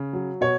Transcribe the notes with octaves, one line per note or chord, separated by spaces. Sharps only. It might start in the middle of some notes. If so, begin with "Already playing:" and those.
Already playing: C#3
F#3
B2 C#5